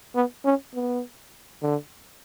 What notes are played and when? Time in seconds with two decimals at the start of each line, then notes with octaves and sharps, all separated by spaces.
0.15 B3
0.45 C#4
0.75 B3
1.62 D3